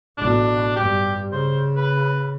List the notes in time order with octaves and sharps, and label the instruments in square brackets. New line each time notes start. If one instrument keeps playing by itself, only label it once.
[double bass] A1 B2 [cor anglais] D4
[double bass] G2 [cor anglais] G4
[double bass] C#3 [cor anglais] C5
[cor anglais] B4